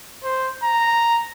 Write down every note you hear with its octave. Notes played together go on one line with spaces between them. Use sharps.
C5
A#5